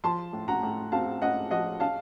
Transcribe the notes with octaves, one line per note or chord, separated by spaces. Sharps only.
F3 A5 C6
A2
F#5 A#5
A2
C4 F5 A5
A2 D#5 F#5
F3 D#5 F#5
C#4 F5 A5